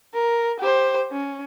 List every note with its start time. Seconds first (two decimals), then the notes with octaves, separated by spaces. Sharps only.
0.14 A#4
0.60 G4 C5
1.11 C#4